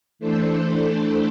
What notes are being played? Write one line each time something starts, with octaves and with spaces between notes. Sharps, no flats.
E3 A3 D4 A4 C5